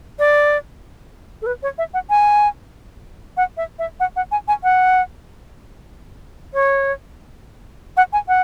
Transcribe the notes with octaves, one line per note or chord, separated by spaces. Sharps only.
D5
A4
B4
C#5
E5
F#5
G#5
F#5
E5
E5
F#5
F#5
G#5
G#5
F#5
C#5
F#5
G#5
F#5